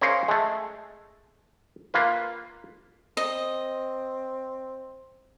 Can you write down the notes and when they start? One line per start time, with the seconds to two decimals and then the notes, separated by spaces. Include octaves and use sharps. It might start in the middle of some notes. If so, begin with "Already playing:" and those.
0.01 C#4 G#4 A#4 C5 C#5 F5
0.28 G#3 A3
1.94 A#3 F4 B4
3.17 C4 D#5